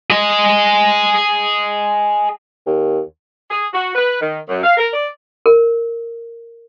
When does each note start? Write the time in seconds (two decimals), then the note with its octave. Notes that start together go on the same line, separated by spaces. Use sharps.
0.10 G#4 D#5
2.66 D#2
3.50 G#4
3.73 F#4
3.95 B4
4.21 D#3
4.49 F#2
4.63 F5
4.77 A#4
4.93 D5
5.46 A#4